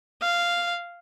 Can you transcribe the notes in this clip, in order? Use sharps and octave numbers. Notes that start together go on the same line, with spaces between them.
F5